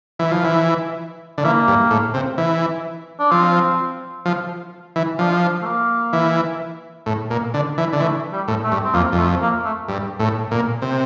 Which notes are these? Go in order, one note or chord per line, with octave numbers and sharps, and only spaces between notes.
E3
F3
E3
D3
E3 A#3
G2
A2
C3
E3
D4
F3 C4
F3
E3
F3 D4
A3
A#3
E3
A2
A#2
D3
E3
D3
E3 A3
G3
A2
A3
G2
C4
F2 A#3
F2
A3
A#3
A3
G2
A2
A#2
C3